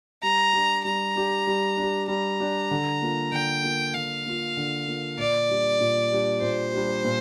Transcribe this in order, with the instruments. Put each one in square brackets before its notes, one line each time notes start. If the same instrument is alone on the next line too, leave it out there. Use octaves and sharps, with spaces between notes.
[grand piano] G3 [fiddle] A#5
[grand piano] D4 G4
[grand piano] G3 [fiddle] A#5
[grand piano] D4 G4
G3
D4
G4
[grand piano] G3 [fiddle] A#5
[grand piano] D4 G4
D3
A#3 F4
[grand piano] D3 [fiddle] G5
[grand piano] A#3 F4
[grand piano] D3 [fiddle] F5
[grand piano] A#3 F4
D3
A#3 F4
[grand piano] A#2 [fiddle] D5
[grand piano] G3 D4 G4
A#2
G3 D4 G4
[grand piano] A#2 [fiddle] C5
[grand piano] G3 D4 G4
A#2